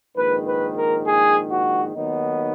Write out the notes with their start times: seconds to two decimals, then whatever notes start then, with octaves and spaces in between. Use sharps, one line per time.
0.15 A#1 G#2 D#3 B4
0.46 B4
0.75 A#4
1.05 G#4
1.50 F#4
1.94 D#2 D#3 F#3 B3 D#4